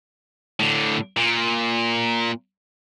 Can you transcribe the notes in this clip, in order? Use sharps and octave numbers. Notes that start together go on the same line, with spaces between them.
A2 D3
A#2